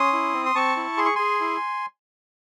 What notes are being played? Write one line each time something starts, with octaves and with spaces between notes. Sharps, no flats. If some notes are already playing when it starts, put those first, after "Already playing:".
Already playing: C#4 C6 D#6
E4
C4
C6
C4 A5 C#6
E4
G#4 C6
C#6
G#4 G#5 C6
E4